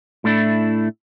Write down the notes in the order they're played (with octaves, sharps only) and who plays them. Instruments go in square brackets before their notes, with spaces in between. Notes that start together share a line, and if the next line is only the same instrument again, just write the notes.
[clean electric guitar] A2 A3 D4 E4